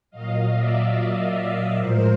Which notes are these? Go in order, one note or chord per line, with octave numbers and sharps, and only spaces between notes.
A#2 F#3 D#5 F5
D5 E5
D#5 F5
D5 E5
A2 F3 G#3 A#4 C5